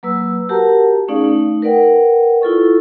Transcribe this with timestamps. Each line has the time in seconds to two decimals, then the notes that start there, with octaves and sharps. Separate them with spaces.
0.03 F#3 A#3 B4 E6
0.49 F#4 G4 A#4 F#5 A5 A#5
1.08 A3 C#4 D#4 G#4 D5 F5
1.21 A3 D#4
1.62 A#4 B4 D5 F#5 G5
2.42 E4 F4 A4 C#6